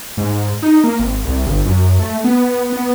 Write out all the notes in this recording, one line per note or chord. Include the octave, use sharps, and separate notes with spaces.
G#2
D#4
A#3
G#1
C2
G1
F#2
A3
B3
B3